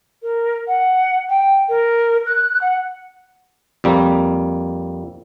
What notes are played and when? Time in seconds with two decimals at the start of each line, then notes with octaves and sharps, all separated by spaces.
0.22 A#4
0.67 F#5
1.29 G5
1.69 A#4
2.26 F#6
2.61 F#5
3.84 F2 G3 A#3